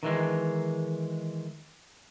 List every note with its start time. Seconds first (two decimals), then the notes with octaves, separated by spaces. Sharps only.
0.03 D#3 E3 G#3